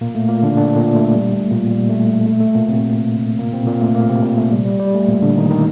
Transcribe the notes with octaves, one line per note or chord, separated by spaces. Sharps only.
A#2 A#3
A3
A#2 A#3
D3 D4
D3 D4
A#2 A#3
A3
G3
A3
A#2 A#3
G3
A3
A3
A3
A3
A#2 A#3
C3 C4
A#2 A#3
C3 C4
A#2 A#3
A3
A#2 A#3
C3 C4
A#2 A#3
A3
G3
G3
G3
A3
A#2 A#3
D3 D4
D#3 D#4
D#3 D#4